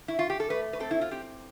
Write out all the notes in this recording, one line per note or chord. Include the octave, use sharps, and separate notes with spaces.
E4
F4
G4
A4
A3 B4
B4
C4 A4
E4
F4
C4 G4